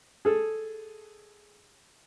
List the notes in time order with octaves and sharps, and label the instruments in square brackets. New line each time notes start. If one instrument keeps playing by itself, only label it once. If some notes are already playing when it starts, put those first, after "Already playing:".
[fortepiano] G#4 A4